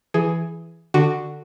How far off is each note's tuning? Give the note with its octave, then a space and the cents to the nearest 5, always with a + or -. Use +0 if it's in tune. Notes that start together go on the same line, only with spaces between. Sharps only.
E3 +15 G#4 +10
D3 +15 F#4 +0